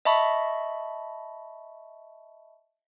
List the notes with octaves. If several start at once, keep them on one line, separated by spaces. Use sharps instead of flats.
D#5 E5 A5 B5 C#6